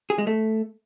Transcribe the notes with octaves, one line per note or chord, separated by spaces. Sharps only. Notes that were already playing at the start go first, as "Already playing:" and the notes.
G#4
G#3
A3